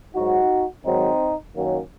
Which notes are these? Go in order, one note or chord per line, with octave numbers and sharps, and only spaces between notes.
G#2 F#3 D#4 F#4
G#2 D#3 F#3 C4 D#4
F#2 D#3 F#3 A#3 C#4